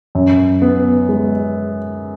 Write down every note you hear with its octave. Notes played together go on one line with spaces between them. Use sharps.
F#2
B3
G#3